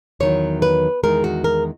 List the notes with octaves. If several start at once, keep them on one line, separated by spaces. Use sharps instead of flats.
E2 D#3 F#3 C#5
B4
E2 D#3 G#3 A#4
F#4
A#4